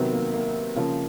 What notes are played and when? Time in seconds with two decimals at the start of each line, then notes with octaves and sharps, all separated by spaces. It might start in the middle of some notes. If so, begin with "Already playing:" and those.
Already playing: C3 D#3 F#3 B3
0.13 A#3
0.34 A#3
0.76 C#3 F3 A#3